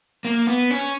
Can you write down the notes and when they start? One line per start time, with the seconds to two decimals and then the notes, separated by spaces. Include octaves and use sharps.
0.25 A#3
0.47 B3
0.71 C#4